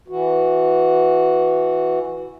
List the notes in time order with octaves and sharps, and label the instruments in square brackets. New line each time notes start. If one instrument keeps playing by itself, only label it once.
[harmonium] E3 F#4